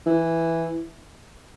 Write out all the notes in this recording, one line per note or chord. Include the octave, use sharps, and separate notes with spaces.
E3